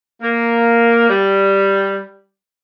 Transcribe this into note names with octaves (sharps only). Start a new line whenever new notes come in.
A#3
G3